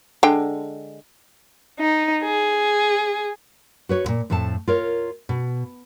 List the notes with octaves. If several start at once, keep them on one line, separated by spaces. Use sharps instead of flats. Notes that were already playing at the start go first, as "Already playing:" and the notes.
D3 G#3 G5
D#4
G#4
F#4 B4 C#5
D#2 A#2
F2 A2 A3 C4 A5
F4 A#4 C#5
B2